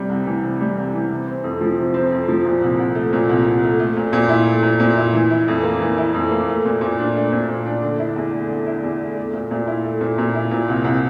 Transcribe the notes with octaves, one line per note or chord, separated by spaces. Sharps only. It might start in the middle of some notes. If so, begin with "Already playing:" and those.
Already playing: C3 G3
C2
E3
C3
G3
C2
E3
C3
C4
F2
F3
C3
C4
F2
F3
A#2
C2
C2
A3
A#2
C2
C2
A3
A3
A#2
A#2
E4
A3
A#2
A#2
E4
E3
E4
F2
A#3
E3
E4
F2
A#3
A3
A#2
A#2
D4
A3
A#2
A#2
D4
D3
E4
E2
A3
D3
E4
E2
A3
A3
A#2
A#2
E4
A3
A#2
A#2
E4
A#2
C2
C2